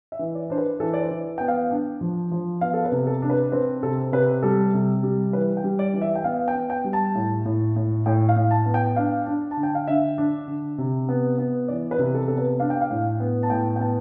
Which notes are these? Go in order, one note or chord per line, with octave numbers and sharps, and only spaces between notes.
E5
E3
D5
D4 C5
B4
E3 A4
D5
C5
E3
B3 G5
F5
D4
F3
F3
B3 F5
A4
B4
C3
A4
D4
B4
C4 B4
C3 A4
C3 B4
G3 A4
C3
G3
E3 B4
G5
G3
D5
E3
E5
G5
B3 F5
G5
B3
G5
G3
A5
A2
A2
A2
A2 G5
F5
A2
A5
B3
G5
D4 F5
D4
A5
D3
G5
F5
D3 E5
D4
D3
C3
B3
B3
E3 D5
B4
C3
A4
B3 A4
B4
D4 F5
G5
F5
A2
B3
A5
A2 G5
G5
B3 A5